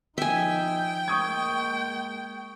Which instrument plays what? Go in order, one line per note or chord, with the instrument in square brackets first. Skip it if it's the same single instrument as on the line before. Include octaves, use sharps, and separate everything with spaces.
[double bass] F3 D#4 [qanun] E5 G#5 [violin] G5
[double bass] G#3 A#3 [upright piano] C#6 D#6 G#6